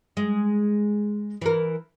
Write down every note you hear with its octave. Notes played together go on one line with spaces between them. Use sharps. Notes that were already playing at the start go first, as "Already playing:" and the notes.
G#3
E3 A#4